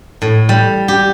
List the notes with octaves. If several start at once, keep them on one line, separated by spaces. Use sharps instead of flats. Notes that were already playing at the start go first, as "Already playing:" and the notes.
A2
G3
G4